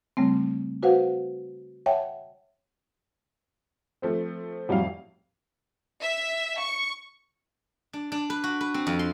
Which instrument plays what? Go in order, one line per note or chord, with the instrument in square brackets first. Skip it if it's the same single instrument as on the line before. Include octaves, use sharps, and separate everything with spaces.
[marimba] C#3 G3 A3 C4
F#4 B4 C5 F5 F#5
C#5 E5 F#5 G5 A5
[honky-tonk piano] F3 A3 C4
[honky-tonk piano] F2 A2 F5 [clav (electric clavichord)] F#3 G3
[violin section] E5
C#6
[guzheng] D4
D4
B4
F#4
B4
C4
F2
C6